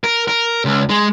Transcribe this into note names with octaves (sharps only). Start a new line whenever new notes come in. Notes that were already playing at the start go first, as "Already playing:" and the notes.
A#4
A#4
C#2
G#3